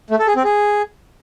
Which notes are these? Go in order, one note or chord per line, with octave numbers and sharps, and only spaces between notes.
A3
A4
G#4
C4
G#4